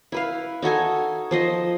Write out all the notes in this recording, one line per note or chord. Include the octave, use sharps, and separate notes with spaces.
E4 B4 F5
D#4 F#4 A4 G#5
F3 C5 D#5